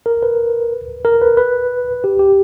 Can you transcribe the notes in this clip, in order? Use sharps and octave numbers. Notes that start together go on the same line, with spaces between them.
A#4
B4
A#4
B4
B4
G4
G4